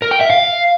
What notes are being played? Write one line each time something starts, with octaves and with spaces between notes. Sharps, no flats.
A#4
G5
E5
F5